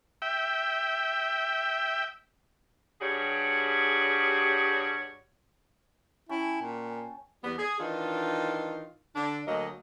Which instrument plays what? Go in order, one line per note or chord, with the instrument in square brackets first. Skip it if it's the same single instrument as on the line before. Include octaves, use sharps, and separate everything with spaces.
[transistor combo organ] E5 G5
[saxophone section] G2 G3 F#4 G#4 C#5
[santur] C#4 G5 A5 [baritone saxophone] E4
[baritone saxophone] A#2
[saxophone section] E2 G3 B3
G#4
D#3 E3 D4 D#4 F4
D3 D4
D2 F#3 A#3 D#5